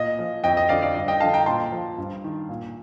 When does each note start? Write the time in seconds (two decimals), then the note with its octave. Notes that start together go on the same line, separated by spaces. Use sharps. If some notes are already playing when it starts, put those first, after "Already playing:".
Already playing: A#2 D#5
0.19 F3
0.44 F2 D#5 G5
0.57 D#5
0.69 D3 F3 D5 F5
0.82 D5 F5
0.95 G2 D#5
1.08 D#5 G5
1.20 D3 F3 F5 A5
1.33 G5 A#5
1.46 A#2 A5 C6
1.72 F3
1.98 G2
2.24 D#3
2.49 A#2